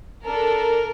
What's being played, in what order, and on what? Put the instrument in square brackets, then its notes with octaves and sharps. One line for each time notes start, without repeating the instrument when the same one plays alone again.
[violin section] D4 A4 A#4